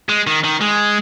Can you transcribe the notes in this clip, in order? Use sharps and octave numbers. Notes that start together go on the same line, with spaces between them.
G#3
D#3
D#3
G#3